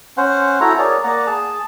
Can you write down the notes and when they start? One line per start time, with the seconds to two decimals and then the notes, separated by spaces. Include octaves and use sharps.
0.17 C#4 C5 F#5
0.61 E4 F#4 A4 A#5
0.79 G#4 A#4 C#5 D5
1.04 A#3 D5 F#5 A#5
1.26 G#4 A5